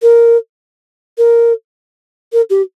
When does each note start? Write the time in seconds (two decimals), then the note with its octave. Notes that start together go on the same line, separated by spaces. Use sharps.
0.02 A#4
1.18 A#4
2.33 A#4
2.50 G4